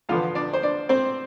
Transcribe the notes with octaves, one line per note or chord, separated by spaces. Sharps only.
E2 D3 F3 B3 F4 F5
D4 D5
C5
D4 D5
C4 C5